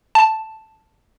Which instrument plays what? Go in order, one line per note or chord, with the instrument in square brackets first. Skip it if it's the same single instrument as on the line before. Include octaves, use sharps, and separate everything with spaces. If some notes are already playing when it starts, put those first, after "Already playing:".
[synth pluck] A5